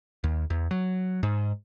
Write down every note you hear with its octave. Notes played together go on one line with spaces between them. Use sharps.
D#2
E2
F#3
G#2